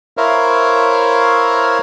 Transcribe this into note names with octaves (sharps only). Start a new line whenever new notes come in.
E4 A#4 C5 C#5 E5 F5